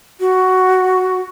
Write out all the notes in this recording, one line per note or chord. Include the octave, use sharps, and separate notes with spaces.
F#4